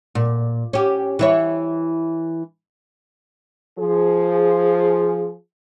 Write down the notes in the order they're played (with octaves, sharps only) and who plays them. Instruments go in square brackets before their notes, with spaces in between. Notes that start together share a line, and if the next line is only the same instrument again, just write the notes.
[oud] A#2
C#4 G4
E3 E4 C#5
[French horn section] F3 G#4